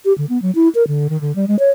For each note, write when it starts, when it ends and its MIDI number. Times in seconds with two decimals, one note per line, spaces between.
0.05 0.13 67
0.18 0.25 50
0.29 0.40 59
0.42 0.51 54
0.55 0.69 64
0.75 0.86 70
0.88 1.08 50
1.10 1.20 51
1.21 1.35 50
1.36 1.45 55
1.48 1.58 56
1.59 1.70 73